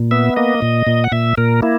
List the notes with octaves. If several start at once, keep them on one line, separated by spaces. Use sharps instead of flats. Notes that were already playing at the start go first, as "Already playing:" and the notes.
Already playing: A#2
B3 E5
A#3 D#5
A#2
A#2
F#5
A#2 E5
A#2 A#4
A#3 E4